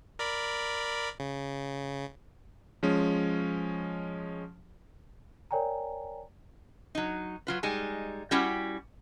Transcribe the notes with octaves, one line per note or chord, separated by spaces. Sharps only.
A#4 D5 B5
C#3
F3 G#3 C#4
A#4 C#5 D5 G5 G#5 A#5
F#3 D#4
F#3 F4 B4
G3 G#3 D#4 G#5
G3 C#4 E4 F#4 G4 F#5